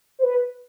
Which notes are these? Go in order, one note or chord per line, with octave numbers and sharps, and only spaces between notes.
C5
B4